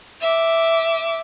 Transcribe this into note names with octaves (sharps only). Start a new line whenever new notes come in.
E5 D6